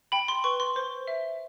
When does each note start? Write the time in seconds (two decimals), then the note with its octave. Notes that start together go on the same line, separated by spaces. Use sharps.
0.12 G5 B5
0.28 C6
0.44 B4 C#6
0.60 C6
0.76 C5
1.08 E5